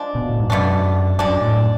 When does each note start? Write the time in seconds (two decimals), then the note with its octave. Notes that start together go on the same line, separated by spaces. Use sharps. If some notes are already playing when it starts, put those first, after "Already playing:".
Already playing: F3 G#3 D4
0.15 B2
0.29 A2
0.40 G#2
0.50 F#2 B2 A3 D4
1.19 F#2 D3 G#3 D4
1.41 A2